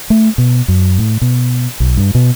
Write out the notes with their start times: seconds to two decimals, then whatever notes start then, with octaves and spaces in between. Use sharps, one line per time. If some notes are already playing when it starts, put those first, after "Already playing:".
0.10 A3
0.38 B2
0.68 F#2
0.98 A2
1.21 B2
1.80 B1
1.97 G2
2.15 B2